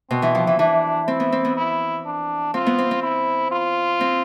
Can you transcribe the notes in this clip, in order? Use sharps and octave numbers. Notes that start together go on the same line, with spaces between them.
B2 C4
E3
F3
E3
E3 D4
C4 E4
B3
C4
B3
E4
D4
C4 F4
B3
C4
C4
E4
F4
C4